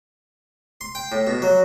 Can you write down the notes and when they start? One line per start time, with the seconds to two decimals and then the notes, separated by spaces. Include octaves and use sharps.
0.81 C6
0.95 G5
1.12 A2
1.27 B2
1.42 F#3